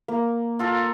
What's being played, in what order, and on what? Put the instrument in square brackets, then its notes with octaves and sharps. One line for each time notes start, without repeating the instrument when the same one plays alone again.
[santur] A#3
[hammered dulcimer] F4 A4 A#5